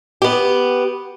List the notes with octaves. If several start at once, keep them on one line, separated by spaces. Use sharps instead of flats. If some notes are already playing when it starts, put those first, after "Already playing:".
B3 G4